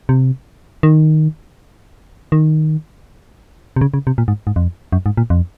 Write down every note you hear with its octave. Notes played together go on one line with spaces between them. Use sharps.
C3
D#3
D#3
C3
C#3
C#3
C3
A#2
G#2
G#2
F2
F#2
G#2
A#2
F2